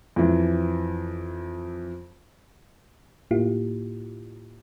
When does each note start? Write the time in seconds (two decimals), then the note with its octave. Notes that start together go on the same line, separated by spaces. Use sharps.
0.16 F2 E3
3.31 A2 A#3 E4 F4 G4